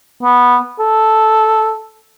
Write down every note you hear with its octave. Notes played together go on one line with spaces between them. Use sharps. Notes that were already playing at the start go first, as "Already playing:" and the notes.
B3
A4